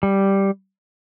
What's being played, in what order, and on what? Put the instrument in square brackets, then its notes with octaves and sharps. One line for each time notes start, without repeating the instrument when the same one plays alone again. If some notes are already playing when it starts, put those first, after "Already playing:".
[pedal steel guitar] G3